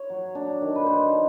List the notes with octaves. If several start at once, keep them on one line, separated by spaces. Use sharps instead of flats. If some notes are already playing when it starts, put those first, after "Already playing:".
Already playing: C#5
F#3
D4
D#3
B4
D#3 C5
D4